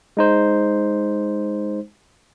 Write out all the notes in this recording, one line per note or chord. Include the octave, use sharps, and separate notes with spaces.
G#3 D#4 C5